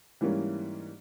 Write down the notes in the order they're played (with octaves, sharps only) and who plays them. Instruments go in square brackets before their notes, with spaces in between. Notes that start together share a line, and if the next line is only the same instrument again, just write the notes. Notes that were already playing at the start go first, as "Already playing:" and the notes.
[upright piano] G#2 E3 G3 A#3 C#4